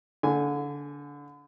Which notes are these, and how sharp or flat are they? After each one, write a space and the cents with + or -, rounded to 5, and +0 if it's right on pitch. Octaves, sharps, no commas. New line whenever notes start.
D3 -25 G#5 +0